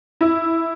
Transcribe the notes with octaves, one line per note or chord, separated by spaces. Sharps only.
E4